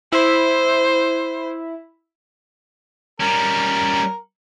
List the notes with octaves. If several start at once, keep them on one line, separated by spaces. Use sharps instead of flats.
E4 C5
G3 C#4 A#4